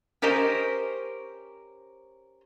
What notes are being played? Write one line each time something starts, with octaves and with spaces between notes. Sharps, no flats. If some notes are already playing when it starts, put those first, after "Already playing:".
C#4 G4 A#4 C5 D#5